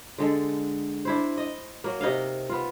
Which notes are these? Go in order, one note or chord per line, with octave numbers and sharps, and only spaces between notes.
D3 G#3 A4
D4 E4 C5
D#5
F#3 A#3
C3 D#4 D#5 F5
B3 F4